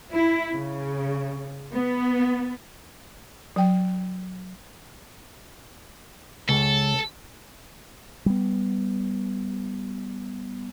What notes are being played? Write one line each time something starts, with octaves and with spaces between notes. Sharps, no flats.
E4
C#3
B3
F#3 G5
C#2 A4
G3 B3